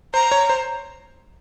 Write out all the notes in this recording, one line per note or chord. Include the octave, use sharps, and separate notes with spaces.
C5 A#5
C#5
C5